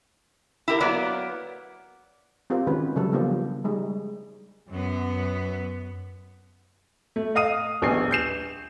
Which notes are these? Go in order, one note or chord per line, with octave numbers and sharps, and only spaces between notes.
E4 G4 A#4
F#3 A#3 B3 D5
C4 F4 G4 A#4 C5
D#3 G#3 C#4 F#4 B4
C#3 F#3 G3 A4
F3 A#3 B3 D4 G4 C5
G3 G#3 D#4
F#2 B3
A3
D#5 F5 D#6 D#7
D#1 A#1 B3 G#5 C7
G6 C7 E7